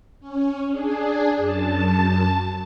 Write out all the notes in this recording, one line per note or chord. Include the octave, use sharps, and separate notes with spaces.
C#4
D4 G#4
F#2 A5